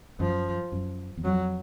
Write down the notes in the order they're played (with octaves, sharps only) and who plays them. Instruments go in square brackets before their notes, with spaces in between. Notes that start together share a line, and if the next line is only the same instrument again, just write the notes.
[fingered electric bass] F#2 [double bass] F3
[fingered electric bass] F#2
E2
[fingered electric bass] F2 [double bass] F#3